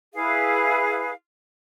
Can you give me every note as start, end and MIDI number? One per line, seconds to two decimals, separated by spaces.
0.14 1.11 64
0.14 1.11 68
0.14 1.11 71
0.14 1.11 77